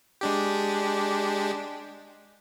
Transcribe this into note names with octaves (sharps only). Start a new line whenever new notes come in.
G#3 D4 G4